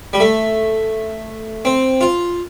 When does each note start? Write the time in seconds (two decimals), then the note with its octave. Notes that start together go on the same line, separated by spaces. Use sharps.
0.13 G3
0.20 A3
1.65 C4
2.01 F4